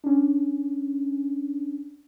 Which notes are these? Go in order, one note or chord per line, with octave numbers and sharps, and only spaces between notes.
C#4 D4